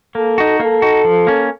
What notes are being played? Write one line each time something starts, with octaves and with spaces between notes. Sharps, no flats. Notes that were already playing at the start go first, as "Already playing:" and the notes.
A#3 A4
D#4 F#4
A#3 A4
D#4 F#4
F3
A#3 C#4